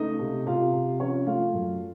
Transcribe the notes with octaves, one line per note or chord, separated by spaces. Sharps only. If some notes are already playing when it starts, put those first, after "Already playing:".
Already playing: C#2 A3 D#4 D#5
C3
C3 F4 F5
C3
F3 C#4 C#5
A3 F4 F5
F#2